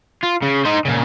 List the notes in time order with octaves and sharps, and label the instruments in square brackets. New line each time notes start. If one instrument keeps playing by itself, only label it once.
[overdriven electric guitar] F4
C#3
D#4 C5
A#2 C#3